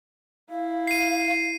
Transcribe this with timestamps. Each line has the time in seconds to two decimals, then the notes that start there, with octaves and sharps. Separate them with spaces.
0.49 E4 F5
0.87 C7 D#7